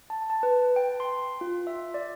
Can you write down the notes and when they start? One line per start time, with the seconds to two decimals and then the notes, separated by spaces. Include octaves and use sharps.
0.10 A5
0.30 A5
0.43 B4
0.76 G5
1.00 C6
1.41 F4
1.67 E5
1.94 D5